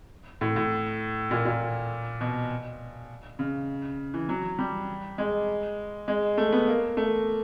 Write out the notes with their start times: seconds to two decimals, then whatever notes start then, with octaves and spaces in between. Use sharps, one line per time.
0.41 A2
0.56 A2
1.31 A#2
1.45 A#2
2.21 B2
3.39 C#3
4.14 E3
4.29 F#3
4.59 G3
5.18 G#3
6.08 G#3
6.38 A3
6.53 B3
6.68 A#3
6.97 A3